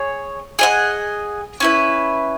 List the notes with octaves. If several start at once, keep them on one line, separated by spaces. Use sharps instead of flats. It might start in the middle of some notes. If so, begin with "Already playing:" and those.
Already playing: G#4 C#5
G#4 D#5 F#5
C#4 E4 B4